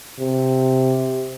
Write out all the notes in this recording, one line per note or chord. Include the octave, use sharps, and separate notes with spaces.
C3